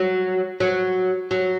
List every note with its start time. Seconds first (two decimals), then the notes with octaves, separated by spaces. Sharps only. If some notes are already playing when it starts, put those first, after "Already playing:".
Already playing: F#3
0.60 F#3
1.31 F#3